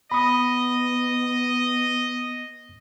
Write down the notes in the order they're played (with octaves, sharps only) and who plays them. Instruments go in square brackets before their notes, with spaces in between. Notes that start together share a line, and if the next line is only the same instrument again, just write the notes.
[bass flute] B3 [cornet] D#5 [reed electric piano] B5 D#6